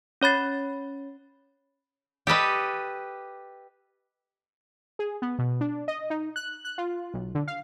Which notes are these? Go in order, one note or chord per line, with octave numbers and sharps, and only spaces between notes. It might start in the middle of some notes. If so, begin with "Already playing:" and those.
C#4 C#5 B5 A6 C7
G4 A4 B4 D#5
G#4
B3
B2
D4
D#5
D#4
F#6
F#6
F4
B1
D3
F5